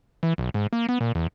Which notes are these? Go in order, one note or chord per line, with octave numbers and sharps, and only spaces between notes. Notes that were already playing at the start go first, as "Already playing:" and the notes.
E3
B1
G#2
A#3
B3
A#2
E2